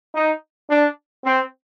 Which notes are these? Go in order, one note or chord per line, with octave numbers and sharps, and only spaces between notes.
D#4
D4
C4